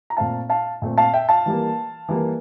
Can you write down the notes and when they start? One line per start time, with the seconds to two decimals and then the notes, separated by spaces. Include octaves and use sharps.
0.10 A#5
0.17 A#2 A3 C4 F5 A5
0.50 F5 A5
0.82 A#2 A3 C4
0.98 F5 A5
1.14 E5 G5
1.29 F5 A5
1.46 E3 G3 A#3
2.09 E3 G3 A#3